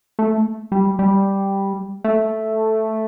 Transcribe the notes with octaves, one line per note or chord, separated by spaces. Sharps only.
A3
G3
G3
A3